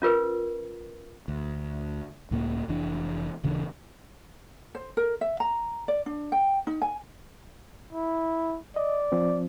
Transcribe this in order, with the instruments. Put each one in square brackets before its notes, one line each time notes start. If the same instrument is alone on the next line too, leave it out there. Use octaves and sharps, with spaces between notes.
[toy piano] C#4 F4 A#4 B4
[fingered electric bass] D2
C#2 A2 A#3
F1 E3 D4
D#1 C#3 E3 D4
[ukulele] C5
A#4
E5
A#5
D5
D4
G5
D#4
G#5
[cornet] E4
[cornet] D5 [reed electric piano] D#5
[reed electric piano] F3 C4